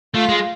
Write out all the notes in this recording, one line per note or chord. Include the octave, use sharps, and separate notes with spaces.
A3 F4
G#3